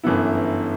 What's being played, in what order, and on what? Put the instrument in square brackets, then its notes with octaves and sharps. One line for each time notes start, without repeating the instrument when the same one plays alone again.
[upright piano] G1 F#2 E3 B3 E4